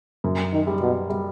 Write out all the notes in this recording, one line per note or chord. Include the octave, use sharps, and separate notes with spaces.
F#2
D#3
G3
B2
G3